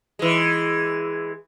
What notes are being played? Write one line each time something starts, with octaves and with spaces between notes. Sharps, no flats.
E3 G#3